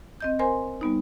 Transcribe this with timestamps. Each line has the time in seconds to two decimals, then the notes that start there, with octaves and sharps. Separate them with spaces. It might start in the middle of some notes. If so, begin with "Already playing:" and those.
0.20 C4 D#5 G6
0.39 A#4 C5 G#5 C6
0.81 G3 B3 D#4